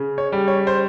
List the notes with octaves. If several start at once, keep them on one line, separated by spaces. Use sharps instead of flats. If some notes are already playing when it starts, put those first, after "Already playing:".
Already playing: C#3
C#5
G3
C#5
C5